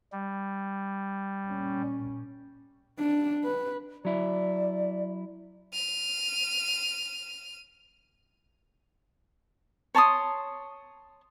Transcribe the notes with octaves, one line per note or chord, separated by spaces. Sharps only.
G3
A#2 C#4
D4
B4
F#3 E4 D5
F6 D#7
C#5 A5 C6 D#6